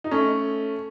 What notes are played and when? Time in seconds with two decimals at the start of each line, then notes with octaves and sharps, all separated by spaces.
0.04 D#4
0.11 A3 C#4